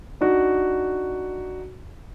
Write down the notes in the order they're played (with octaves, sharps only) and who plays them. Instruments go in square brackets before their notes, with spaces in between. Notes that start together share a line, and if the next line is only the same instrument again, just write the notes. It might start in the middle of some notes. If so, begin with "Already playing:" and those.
[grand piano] D4 D#4 F#4